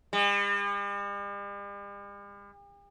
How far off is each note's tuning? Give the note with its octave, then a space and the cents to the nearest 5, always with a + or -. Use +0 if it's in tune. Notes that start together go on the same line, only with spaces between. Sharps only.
G3 +45